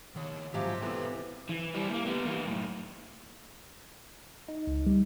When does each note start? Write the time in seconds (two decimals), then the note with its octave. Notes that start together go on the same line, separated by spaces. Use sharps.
0.16 D#3 C#5
0.54 G#2 C3 F3 F#3 G4
0.82 E3 B3 C4 A4 B4
1.49 E3
1.74 G3 E4
1.90 A3 A#3
2.05 G3 B3
2.26 E3 A#3
2.45 F#2 A2
4.48 D#4
4.67 C#2
4.86 G3